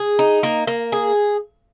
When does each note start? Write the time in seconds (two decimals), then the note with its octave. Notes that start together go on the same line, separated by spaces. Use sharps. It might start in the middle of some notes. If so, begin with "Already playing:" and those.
Already playing: G#4
0.19 D#4
0.43 A#3
0.67 A#3
0.92 G#4